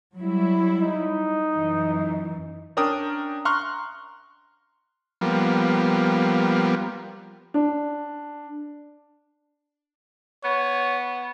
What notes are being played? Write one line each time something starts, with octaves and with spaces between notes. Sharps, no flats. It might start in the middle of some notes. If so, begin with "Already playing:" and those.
F#3 G3 E4
D#4
F#2 E3
C#4 D4 A#4 G5 D#6
A#5 C6 C#6 F6 F#6
F3 G3 A#3 B3
D4
B3 C#5